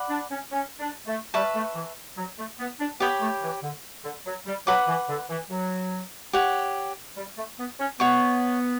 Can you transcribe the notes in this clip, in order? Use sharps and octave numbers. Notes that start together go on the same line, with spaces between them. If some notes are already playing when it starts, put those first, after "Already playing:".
Already playing: D5 F#5 B5
D4
C#4
C#4
D4
A3
G3 B4 E5 A5 C#6
A3
E3
F#3
A3
B3
D4
B3 G4 C#5 G5 B5
A3
E3
D3
D3
F#3
G3
F#3 B4 F#5 B5 D6
E3
D3
E3
F#3
G4 C#5 F#5
G3
A3
B3
C#4
B3 C#5 F#5 C#6